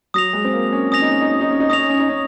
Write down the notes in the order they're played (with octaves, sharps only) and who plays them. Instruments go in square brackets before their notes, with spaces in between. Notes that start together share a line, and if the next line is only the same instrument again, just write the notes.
[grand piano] F#3 [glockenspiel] D#6 A#6 F7
[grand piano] G#3
C4
A#3
C#4
[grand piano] C#4 [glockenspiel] D#6 A#6 F7
[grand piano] D#4
C#4
D#4
C#4
D#4
C#4
D#4
[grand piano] C#4 [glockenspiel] D#6 A#6 F7
[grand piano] D#4
C#4
D#4
C#4